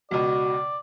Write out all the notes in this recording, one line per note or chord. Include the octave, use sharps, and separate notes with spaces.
C#2 B2 F#4 D5